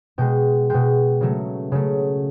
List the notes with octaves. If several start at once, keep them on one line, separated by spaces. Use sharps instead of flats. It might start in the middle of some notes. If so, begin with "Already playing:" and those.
B2 G#3 G5
B2 G#3 G5
C#3 F#3 A3
C#3 F#3 A3